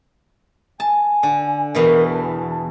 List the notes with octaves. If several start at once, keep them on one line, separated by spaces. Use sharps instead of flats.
G#5 A5
D3
E2 B2 E3 A#4
A5